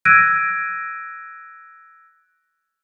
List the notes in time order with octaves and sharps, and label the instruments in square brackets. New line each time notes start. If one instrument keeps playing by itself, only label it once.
[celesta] E6 F#6 G#6 A#6 D7 D#7